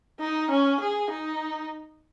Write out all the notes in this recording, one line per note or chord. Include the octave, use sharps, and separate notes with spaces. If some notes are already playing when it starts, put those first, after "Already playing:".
D#4
C#4
G#4
D#4